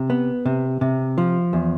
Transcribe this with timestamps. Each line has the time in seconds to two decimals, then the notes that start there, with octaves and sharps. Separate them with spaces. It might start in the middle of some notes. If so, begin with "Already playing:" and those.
Already playing: C3
0.10 B3
0.45 C3
0.81 C3
1.18 F3
1.53 E2